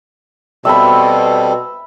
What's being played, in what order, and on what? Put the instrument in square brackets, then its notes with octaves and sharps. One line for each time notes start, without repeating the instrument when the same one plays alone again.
[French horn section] B2 [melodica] G3 C4 A4 [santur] E5 B5